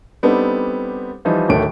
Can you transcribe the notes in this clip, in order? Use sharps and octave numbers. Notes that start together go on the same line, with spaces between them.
G3 B3 C4 D4 D#4 A4
E3 F3 G3 D#4
D1 D3 D#3 A3 C#5 D7